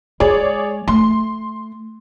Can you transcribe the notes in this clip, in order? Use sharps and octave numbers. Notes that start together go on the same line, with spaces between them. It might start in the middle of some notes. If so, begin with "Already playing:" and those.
G#3 G#4 C#5 D5
A3 C6